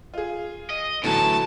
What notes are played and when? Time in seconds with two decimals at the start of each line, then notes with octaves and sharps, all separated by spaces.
0.14 F4 G#4
0.70 D#5
1.03 A2 D3 E3 F#3 A5